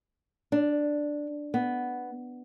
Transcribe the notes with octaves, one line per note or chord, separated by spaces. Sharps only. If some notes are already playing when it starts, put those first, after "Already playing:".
D4
B3